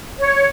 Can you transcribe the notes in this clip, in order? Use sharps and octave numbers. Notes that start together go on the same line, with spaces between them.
C#5